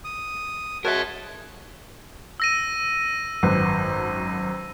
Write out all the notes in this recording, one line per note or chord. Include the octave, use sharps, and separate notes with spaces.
D#6
G#3 F#4 A#4 C#5 E5 A5
E6 A#6 D#7
G#1 F#2 B4